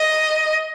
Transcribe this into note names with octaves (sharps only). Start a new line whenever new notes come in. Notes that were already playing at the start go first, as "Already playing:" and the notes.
Already playing: D#5